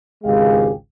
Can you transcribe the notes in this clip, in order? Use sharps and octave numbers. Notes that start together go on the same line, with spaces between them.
G#1 C#2 G#3 G4 G#4 F5